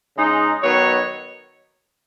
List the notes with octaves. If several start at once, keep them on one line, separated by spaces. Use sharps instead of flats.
C#3 G#3 D#4
D#3 F#3 B3 D#4 C#5